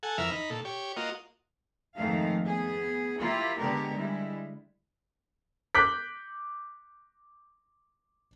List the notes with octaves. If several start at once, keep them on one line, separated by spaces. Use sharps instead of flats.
A4 F#5 G#5
F2 E3 A#4 E5 F6
D#4 B5
A#2 A4
G4 C#5
A#3 F4 F#4 D#5
F2 G#2 D#3 G#3 A3 F5
B3 G#4
A#3 E4 F4 G4
D3 G#3 B3 G4 A#4
G3 G#3 E4
D6 F#6 G6 B6